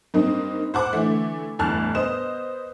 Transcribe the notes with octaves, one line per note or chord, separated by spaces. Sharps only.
G2 A#3 C4 D#4
C5 F#5 D6
D3 E3 A3
G1 E2 A2 A5 F6 F#6
B3 C5 D#5 E7